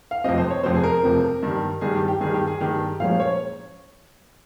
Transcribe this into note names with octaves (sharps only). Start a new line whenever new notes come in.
F5
F2 C3 F3 C4 D#5
C5
C#5
F2 C3 F3 C4 C5
G#4
A#4
F2 C3 F3 C4
G2 D#3 G3
G2 D#3 G3 G#4
G4
G4
G2 D#3 G3 G#4
G4
G#4
G2 D#3 G3 G4
A#2 F3 G#3 C#4 F5
C#5